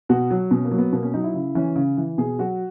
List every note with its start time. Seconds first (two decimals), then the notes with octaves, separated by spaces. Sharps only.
0.09 B2 F#4
0.31 F#3
0.51 B2 C#4
0.65 A#3
0.71 F#3
0.78 B3
0.93 B2 A#3
1.03 C#4
1.14 F#3 D#4
1.24 E4
1.34 C#3 E4
1.55 E3 C#4
1.76 C#3
1.97 E3
2.18 B2 G#4
2.39 F#3 F#4